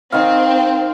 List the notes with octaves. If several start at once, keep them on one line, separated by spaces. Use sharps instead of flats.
D#3 C4 D#5 F5